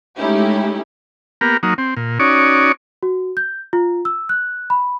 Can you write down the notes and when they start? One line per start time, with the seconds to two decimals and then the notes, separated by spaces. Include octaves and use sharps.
0.16 G#3 A3 C#4 D#4 E4 G4
1.41 A#3 B3 G4 A#4
1.63 F#3 A#3 D#4
1.78 C4
1.97 A#2
2.19 C#4 D#4 F#4 C#5 D5
3.03 F#4
3.37 G6
3.73 F4
4.05 E6
4.29 F#6
4.70 B5